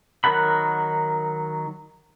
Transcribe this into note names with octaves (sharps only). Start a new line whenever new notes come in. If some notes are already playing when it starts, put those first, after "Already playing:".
D#3 F#3 A#4 F#5 B5